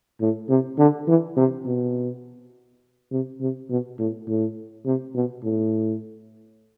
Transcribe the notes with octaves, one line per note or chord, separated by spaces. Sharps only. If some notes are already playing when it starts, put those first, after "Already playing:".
A2
C3
D3
E3
C3
B2
C3
C3
B2
A2
A2
C3
B2
A2